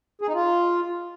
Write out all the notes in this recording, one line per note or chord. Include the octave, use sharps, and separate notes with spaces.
G#4
D#4
F4